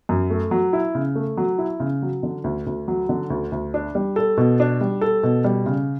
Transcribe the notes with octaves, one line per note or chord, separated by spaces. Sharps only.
F#2
A3
F#3
E4
C#3
A3
F#3
E4
C#3
F#3
D3
D2
D2
F#3
D3
D2
D2
D4
G3
A4
B2
D4
G3
A4
B2
G3
C#3